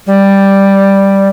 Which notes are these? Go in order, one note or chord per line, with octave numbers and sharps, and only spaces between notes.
G3